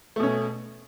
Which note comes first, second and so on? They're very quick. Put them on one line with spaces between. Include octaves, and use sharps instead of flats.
A3 B2 C#4